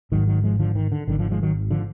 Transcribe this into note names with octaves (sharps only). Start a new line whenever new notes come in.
G#1 G#2 D#3 F#3
D#3 F#3
F3 G#3
D3 F3
D#3
D3
G#1 F#2 D3 D#3
D3 F3
F3 G#3
D#3 F#3
D3 F3